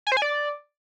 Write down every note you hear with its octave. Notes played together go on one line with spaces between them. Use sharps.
G#5
C5
G#5
D5